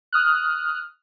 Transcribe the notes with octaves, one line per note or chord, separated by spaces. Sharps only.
D#6 F6 F#6